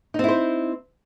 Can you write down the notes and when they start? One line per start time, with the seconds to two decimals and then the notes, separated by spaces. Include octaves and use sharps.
0.14 D#4
0.19 C4
0.24 E4
0.29 C5